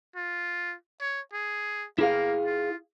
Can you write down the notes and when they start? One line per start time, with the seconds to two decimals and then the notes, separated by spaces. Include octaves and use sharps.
0.16 F4
1.01 C#5
1.33 G#4
1.99 A#3 E4 G#4 F5
2.45 F4